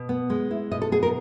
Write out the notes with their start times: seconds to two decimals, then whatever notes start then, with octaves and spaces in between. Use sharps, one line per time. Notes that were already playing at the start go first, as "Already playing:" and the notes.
Already playing: B2
0.09 B3
0.30 G#3
0.51 E4
0.71 B2 D#5
0.82 A4
0.92 B3 G#4
1.03 A#4